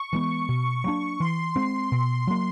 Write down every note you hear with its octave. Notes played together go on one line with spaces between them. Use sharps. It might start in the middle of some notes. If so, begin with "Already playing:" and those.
Already playing: C#6
E3 G#3 B3
B2
F#3 A#3 D4
E3 C6
G#3 C4
B2
F#3 A#3